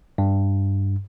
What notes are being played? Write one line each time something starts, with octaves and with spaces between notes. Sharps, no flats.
G2